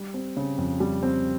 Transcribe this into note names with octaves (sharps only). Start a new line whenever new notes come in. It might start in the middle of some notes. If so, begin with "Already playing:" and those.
Already playing: G3
C4
C#3
F2
G3
C4